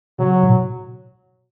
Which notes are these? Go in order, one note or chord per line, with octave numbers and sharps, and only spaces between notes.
C#3 F#3
A2
B2